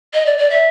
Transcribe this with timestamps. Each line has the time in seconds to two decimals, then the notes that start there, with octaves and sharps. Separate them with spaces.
0.14 D#5
0.26 D5
0.38 D5
0.50 E5